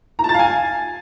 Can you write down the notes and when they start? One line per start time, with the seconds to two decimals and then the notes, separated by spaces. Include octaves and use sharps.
0.19 A#5
0.24 A5
0.29 A6
0.34 F5
0.39 G#5